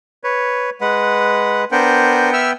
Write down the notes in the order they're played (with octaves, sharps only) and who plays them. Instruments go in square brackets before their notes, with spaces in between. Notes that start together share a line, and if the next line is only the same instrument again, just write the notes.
[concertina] B4 C#5
[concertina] G#3 B4 [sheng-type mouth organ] F#5
[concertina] B3 F#5 G5 [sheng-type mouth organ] D4 A#4 C5
[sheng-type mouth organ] E5 E6 F6